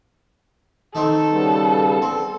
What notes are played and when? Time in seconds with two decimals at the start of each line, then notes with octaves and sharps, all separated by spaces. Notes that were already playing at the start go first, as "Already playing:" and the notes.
0.95 D#3 A3 C4 A4
1.30 C#3 G3 B3
2.02 C4